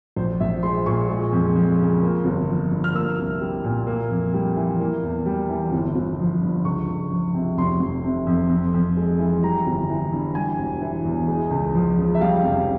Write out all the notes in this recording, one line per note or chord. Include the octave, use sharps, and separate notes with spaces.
A#1 C5
A#1 E5
G#3 C6
A#2 C#6
G#3
F2
F3
C#3
A#3
G1
F3
G2
F6
A#3 E6
C2
G3
A#2
A#3
F2
G3
E3
A#3
E2
G3
E3
G1
G1
F3
G2
C#2 C#6
C#2
F3
C3
F1 C6
F1
C3
F2
F2
F2
G#3
E3
G3 A#5
G1
E3
G2
G3 G#5
E1
E3
E2
G#3
C#2
F3
C#3
E5
G3 F5
F1